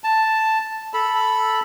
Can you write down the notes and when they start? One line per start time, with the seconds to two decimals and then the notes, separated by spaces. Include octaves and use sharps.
0.04 A5
0.94 A4 B5